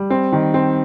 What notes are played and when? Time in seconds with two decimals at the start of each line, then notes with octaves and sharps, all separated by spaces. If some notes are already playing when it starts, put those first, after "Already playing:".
Already playing: G3
0.10 C4
0.32 D#3
0.54 C4